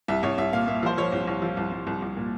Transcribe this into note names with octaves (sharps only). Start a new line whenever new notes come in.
C2 E5
C2 C#5
C2 E5
A#2 F5
A#2 E5
F3 C5
F3 C#5
C2
C2 C#5
F3
C2
C2
C2
C2
A#2